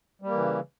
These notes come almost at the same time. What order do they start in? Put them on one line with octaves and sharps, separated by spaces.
G3 A#3 E3 C#3